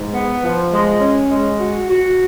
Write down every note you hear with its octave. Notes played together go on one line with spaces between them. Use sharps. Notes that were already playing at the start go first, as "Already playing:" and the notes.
Already playing: G#2
B3
F3
G#3
C#4
G#3
F#4
F#4